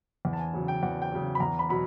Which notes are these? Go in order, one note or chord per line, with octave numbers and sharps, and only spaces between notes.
E2
A5
G#5
C#3 F#3
G5
E2 F#5
G5
C#3 F#3
B5
E2 A#5
B5
B2 F#3 B5